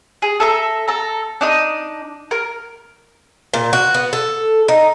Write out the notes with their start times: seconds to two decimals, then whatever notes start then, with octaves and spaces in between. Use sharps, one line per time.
0.22 G#4
0.40 A4 E5 A#5
0.88 A4 A#5
1.41 D4 D#4 D#6
2.31 A#4
3.54 A#2
3.73 F#4
3.94 B3
4.13 A4
4.68 D#4